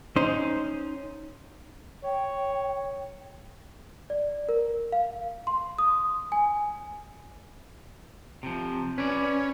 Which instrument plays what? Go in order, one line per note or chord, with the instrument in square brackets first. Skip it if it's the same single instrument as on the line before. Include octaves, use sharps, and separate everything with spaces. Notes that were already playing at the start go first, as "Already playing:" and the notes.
[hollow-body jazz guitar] C#4 D#4 C5
[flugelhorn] C#5 [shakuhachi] G5
[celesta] D5
A#4
F5
C6
D#6
G#5
[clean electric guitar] C3 F3
[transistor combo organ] C#4 [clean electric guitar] B4 D5